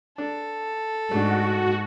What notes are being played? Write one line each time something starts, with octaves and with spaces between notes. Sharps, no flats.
D4 A4
G#2 A3 D4 F#4